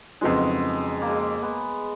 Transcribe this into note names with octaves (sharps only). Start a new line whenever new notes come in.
F2 C#3 F#3 G#3 B3 D#4
A#3
G#3
A#3
G#3 B3